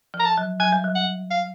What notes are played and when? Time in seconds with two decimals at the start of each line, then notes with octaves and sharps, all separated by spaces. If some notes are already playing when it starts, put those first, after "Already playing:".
0.14 F3
0.20 A#5
0.25 A5
0.38 F#3
0.60 F#3 G#5
0.72 G3
0.84 F#3
0.95 F#5
1.30 F5